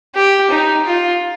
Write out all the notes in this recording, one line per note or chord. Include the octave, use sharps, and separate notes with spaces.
G4
D#4
F4